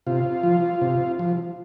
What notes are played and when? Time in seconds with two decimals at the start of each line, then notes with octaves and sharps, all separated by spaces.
0.07 C3 F4
0.43 F3
0.82 C3
1.19 F3